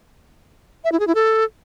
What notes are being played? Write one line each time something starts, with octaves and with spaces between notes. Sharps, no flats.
E5
E4
G#4
E4
A4